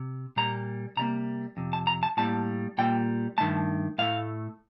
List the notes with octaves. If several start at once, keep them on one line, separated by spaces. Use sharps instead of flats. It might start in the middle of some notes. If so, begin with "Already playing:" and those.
Already playing: C3
A#2 G3 A#3 A#5
C3 G3 A#3 A#5
F2 C3
A5
A#5
A5
A2 G3 A#3 A5
A#2 G3 A#3 G5
G2 D#3 A3 A5
A2 A3 F5